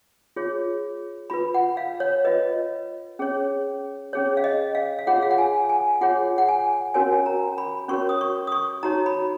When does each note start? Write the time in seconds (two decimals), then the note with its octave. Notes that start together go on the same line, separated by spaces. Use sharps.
0.36 F4 G#4 C#5
1.30 F4 B4 B5
1.54 F#5
1.77 F5
2.00 C#5
2.25 F4 B4 D#5
3.19 C#4 G#4 C#5
4.13 C#4 G#4 C#5
4.37 F5
4.44 D#5
4.75 F5
4.99 F5
5.07 F4 G#4 C#5 F#5
5.23 F5
5.31 F#5
5.38 G#5
5.70 G#5
6.01 F4 G#4 C#5 F#5
6.38 F#5
6.49 G#5
6.94 C#4 F#4 A#4 C#5 G#5
7.26 A#5
7.58 B5
7.88 C#4 F#4 A#4 C#5 C#6
8.09 D#6
8.21 C#6
8.47 D#6
8.52 C#6
8.83 D#4 F#4 C#5 A#5
9.06 B5